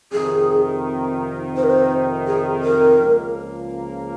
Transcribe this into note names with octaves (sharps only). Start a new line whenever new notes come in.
F2 C3 D#3 G#4
C5
A#4
C5
G#4
A#4
C#2 C#3 F3 A#3 F4